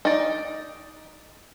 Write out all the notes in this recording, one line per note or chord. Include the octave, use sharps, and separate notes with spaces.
D#4 D5